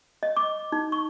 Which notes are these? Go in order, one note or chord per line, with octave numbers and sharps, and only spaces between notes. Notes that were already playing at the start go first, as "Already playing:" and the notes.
D#5
D6
D#4
C#6